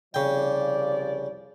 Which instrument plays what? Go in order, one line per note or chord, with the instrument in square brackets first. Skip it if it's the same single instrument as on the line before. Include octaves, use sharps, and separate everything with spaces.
[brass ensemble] C2 F3 D5 [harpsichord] C#3 G5